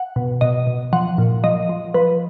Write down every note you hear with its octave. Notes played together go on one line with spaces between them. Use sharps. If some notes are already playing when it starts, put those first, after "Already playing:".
Already playing: F#5
B2
B2 D#5
B2
F3 F#5
A#2
F3 D#5
F3
F3 B4